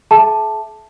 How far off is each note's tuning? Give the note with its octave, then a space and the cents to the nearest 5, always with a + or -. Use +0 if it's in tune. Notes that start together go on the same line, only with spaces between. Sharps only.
G#4 +45 E5 +0 A5 +0